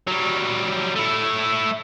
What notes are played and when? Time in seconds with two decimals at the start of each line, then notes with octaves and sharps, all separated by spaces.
0.07 F#3 G3
0.96 A3 E4